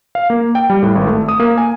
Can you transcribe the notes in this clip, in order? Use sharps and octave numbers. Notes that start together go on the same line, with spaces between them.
F5
A#3
G5
G3
A2
G#1
A3
D#6
A#3
G#5